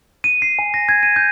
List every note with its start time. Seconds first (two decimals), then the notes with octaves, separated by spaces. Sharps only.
0.24 D#7
0.42 C7
0.59 G#5
0.74 A#6
0.89 G#6
1.03 D#7
1.16 G6